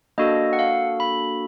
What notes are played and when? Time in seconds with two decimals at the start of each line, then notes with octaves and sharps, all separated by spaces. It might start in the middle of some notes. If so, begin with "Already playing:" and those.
0.18 A#3 D4 F#4 A4 D#5
0.53 F#5
0.59 F5
1.00 B5